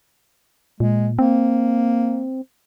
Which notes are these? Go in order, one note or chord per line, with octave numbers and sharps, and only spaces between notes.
A#2 G#3
A#3 C4